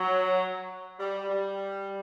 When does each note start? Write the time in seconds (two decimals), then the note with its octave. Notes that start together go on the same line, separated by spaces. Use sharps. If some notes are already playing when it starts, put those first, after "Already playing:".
Already playing: F#3
1.00 G3
1.30 G3